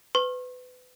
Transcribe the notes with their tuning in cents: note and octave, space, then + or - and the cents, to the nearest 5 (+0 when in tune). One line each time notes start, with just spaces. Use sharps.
B4 +30 C#6 -45